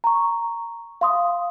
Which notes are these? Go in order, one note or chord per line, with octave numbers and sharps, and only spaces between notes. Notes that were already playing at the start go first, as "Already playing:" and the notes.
A#5 C#6
F5 C6 D#6